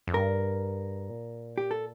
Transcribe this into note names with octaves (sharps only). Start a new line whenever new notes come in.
F2
G2 A#4
A#2
G4
A4